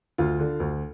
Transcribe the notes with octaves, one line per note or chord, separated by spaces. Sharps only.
D2 F4
D3
D2